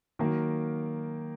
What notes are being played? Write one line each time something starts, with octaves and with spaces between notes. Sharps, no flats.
D#3 F#3 A#3